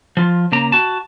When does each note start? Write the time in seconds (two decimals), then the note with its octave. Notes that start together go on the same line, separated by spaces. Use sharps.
0.17 F3 F4
0.52 C#3 A#3 A#5
0.72 F#4 A5